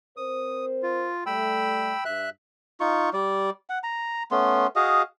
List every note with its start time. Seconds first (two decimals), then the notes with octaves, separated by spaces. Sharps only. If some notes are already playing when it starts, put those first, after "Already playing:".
0.17 C4 A#4 C5 D#6
0.83 F4
1.26 G3 A3 G5 B5 E6
2.05 G2 E5 F#6
2.80 D#4 F4 C#6
3.13 G3 D5
3.70 F#5
3.83 A#5
4.31 A3 B3 C#4 C6
4.76 F#4 G#4 D#5 F5